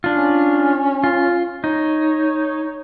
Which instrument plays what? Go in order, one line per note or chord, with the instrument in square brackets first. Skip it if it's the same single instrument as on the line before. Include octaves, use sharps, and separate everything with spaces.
[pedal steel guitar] D4 F4
[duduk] C#4
[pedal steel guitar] F4
[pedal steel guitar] D#4 [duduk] C#5